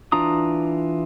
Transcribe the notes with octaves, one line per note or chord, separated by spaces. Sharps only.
E3 D4 F4 A#5 D#6